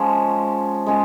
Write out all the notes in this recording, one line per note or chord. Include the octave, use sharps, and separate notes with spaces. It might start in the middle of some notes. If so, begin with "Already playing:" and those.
Already playing: F3 G#3 C#4
G#3 C#4 F4